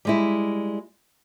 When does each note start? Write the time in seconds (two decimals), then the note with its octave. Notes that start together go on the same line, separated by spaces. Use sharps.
0.05 G3 G#3 E4